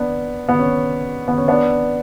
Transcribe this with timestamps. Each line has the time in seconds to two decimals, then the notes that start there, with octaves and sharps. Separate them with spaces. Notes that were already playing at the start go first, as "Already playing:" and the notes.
Already playing: B3 D4
0.49 B3
0.59 C#4
1.28 B3
1.38 C#4
1.48 B3 D4